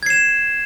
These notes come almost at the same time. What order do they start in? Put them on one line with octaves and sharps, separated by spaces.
G#6 C7 E7